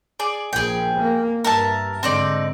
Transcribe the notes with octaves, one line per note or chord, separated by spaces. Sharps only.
G#4 D5
A#1 G#4 G5
A#3
G2 A#4 E5 A5
G#2 D3 C4 D#4 D5